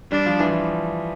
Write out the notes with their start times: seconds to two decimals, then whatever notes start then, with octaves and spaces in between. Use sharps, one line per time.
0.12 G3 D4
0.26 F3
0.40 E3
0.49 F3